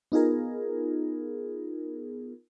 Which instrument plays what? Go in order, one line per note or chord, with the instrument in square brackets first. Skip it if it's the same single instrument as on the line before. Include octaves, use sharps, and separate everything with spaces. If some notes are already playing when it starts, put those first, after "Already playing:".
[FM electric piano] B3 D#4 F4 G#4 A#4